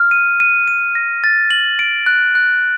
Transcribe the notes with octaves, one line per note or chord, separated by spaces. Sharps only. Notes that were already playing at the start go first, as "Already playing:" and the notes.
Already playing: F6
D#7
D#7
D#7
A#6
A6
F#7
D7
F#6
F#6